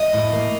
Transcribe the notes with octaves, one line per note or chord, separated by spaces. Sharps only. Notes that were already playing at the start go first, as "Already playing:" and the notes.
Already playing: D#5
A2
A#3